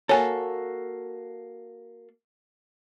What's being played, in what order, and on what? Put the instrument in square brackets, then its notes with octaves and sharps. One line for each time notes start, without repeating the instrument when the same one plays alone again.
[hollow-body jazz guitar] A#3 F#4 A4 [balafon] C#5 G#5